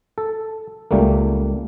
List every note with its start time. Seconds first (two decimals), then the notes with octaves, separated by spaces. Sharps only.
0.18 A4
0.91 C#2 G3 A3 A#3